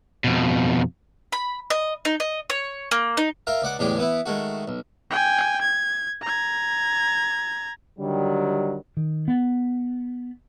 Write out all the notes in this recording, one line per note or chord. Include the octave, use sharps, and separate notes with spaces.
F2 B2
B5
D#5
D#4
D#5
C#5
A#3
D#4
F4 A#4 E5
C#2 D5 F#5 D6
E2 A2 D3 G#3 D4 G4
E3 B3 E4
D#3 G#3 A3 F#4
B1
G5 G#5
G#6
A#5 G#6
D3 D#3 F#3 G3
D#3
B3